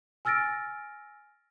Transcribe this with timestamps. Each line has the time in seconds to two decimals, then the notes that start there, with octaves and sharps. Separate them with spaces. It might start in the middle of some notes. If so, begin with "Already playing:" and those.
0.25 G#5 E6 F6 A6 A#6 D7